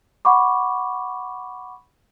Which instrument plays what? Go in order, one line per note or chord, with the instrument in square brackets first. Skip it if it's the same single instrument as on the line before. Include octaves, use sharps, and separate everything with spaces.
[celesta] F#5 B5 C#6 D6